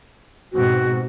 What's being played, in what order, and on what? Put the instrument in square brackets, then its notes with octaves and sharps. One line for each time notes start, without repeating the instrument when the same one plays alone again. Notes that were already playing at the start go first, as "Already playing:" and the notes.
[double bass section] G#2 B2 C4 [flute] F#4